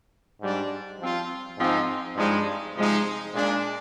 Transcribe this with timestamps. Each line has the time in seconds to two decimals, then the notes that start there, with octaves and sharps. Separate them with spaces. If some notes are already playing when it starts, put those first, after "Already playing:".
0.41 G#2 G3 D4
1.00 F3 C4 F4
1.58 G#2 F3 C4 D#4
2.17 G2 F3 G#3 D#4
2.76 C3 F3 G#3 D#4
3.34 A#2 G#3 D4